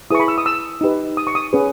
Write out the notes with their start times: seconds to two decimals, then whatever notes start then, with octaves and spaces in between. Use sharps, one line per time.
0.10 E4 G#4 B4 C#6 D#6
0.20 B5
0.28 E6
0.38 D#6
0.46 E6
0.81 D#4 G4 B4
1.17 D#6
1.27 C#6
1.35 D#6
1.53 C#4 G#4 B4